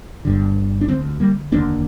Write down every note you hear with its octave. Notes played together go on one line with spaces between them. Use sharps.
G1 G2 D3
D4
D2 D3 G#3 C4
G3 A#3
F1 D#2 D3 A#3 D4